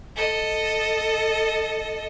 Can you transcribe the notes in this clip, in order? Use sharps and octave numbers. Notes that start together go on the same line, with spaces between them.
A4 D#5